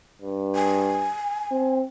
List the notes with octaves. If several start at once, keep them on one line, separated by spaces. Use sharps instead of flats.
G2
G#5
C4